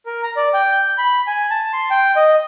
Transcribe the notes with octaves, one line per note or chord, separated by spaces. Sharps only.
A#4
A#5
D5
G5
G6
B5
G#5
A5
C6
G5
D#5